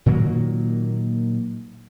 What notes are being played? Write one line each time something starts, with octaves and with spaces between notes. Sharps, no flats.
A#2 D#3 F#3 A#3